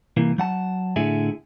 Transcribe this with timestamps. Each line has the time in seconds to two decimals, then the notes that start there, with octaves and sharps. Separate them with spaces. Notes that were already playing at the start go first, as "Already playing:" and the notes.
0.17 C2 E3 A#3
0.38 F#3 F#5 A5
0.96 A2 D3 G#4 E5 G#5